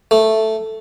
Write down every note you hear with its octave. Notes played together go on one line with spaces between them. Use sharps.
A3